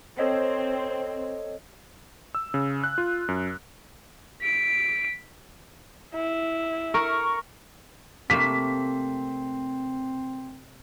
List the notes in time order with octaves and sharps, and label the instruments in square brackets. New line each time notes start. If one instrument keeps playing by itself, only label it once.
[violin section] C4 [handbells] A4 C#5 D#5
[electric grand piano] E6
C#3
F#6
F4
F#2
[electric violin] B6 D7
[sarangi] E4
[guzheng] A#4 [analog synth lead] C#6
[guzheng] C3 A3 A#3 [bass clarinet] C4 [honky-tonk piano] B6